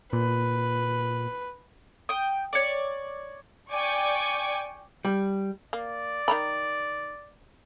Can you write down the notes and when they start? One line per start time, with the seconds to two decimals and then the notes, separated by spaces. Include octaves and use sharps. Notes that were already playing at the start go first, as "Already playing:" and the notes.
0.13 A#2 B4
2.09 G5 D#6
2.53 C#5 D5
3.72 D5 G5 G#5 C#6 D6
5.05 G3
5.73 A#3 D5
6.28 D#3 A#5 B5